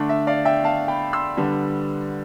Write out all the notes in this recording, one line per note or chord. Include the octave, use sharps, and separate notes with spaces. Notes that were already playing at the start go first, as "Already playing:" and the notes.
Already playing: D3 A3 D4
E5
D5 F5
E5 G5
F5 A5
G5 B5
C6 E6
D3 G3 B3 D4